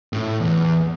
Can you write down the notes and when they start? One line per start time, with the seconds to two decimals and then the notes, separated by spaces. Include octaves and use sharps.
0.13 A2
0.40 E2